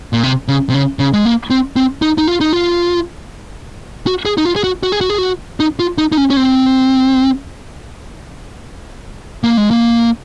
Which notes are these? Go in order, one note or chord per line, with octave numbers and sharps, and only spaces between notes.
A#2
C3
C#3
C3
C#3
C#3
G#3
A#3
C4
C4
D#4
D#4
F4
D#4
F4
F#4
G#4
D#4
F4
G#4
F#4
F#4
G#4
F#4
G#4
F#4
D#4
F4
D#4
D#4
C#4
C#4
C4
A#3
G#3
A#3